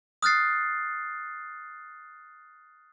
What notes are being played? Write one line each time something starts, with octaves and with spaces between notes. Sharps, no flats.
D#6 F6 F#6 A6 C7